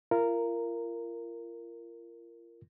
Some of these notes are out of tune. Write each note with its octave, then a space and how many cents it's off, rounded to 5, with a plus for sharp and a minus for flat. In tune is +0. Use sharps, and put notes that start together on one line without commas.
F4 -35 A#4 -10